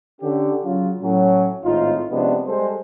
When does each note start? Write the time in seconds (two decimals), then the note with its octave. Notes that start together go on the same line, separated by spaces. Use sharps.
0.21 D3 C#4 G4
0.64 C#3 F#3 F4
1.02 A2 F#3 C#4
1.65 G#1 A2 D#4 F4
2.11 C3 F3 G#3 B3 C#4 D4
2.47 G3 G#3 A4 C5